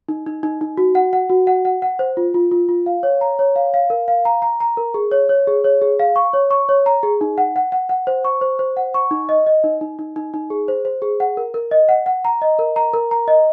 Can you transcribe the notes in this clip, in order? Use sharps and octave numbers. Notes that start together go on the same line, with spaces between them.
D#4
D#4
D#4
D#4
F#4
F#5
F#5
F#4
F#5
F#5
F#5
C5
F4
F4
F4
F4
F5
C#5
A#5
C#5
F5
F5
A#4
F5
A#5
A#5
A#5
A#4
G#4
C#5
C#5
G#4
C#5
G#4
F5
C#6
C#5
C#6
C#5
A#5
G#4
D#4
F#5
F#5
F#5
F#5
C5
C#6
C5
C5
F#5
C#6
D#4
D#5
D#5
D#4
D#4
D#4
D#4
D#4
G#4
C5
C5
G#4
F#5
A#4
A#4
D#5
F#5
F#5
A#5
D#5
A#4
A#5
A#4
A#5
D#5